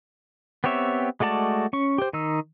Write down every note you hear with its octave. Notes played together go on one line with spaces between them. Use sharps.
B3 C4 G4 C#5 E5
G#3 A3 F#4 D5 A5
C#4 C#6
G4 C5
D#3 D#4 E6